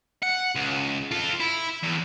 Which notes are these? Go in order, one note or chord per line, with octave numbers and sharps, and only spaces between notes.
F#5
C#2
F4 A4
E4
E2